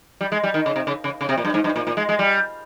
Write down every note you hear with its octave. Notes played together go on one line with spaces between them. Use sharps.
G3
G#3
G3
D#3
C#3
C3
C#3
C#3
C#3
C3
A#2
G2
G#2
G2
A#2
A#2
G#3
G#3
G3